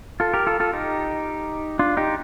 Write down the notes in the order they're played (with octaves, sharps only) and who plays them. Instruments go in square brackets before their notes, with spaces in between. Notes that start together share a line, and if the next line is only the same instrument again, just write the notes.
[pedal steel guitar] F4 A4
G4 A#4
F4 A4
F4 A4
D#4 G4
D4 F4
D#4 G4